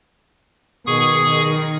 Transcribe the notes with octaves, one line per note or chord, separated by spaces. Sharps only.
B2 D#3 G#4 C#6 D#6
D#3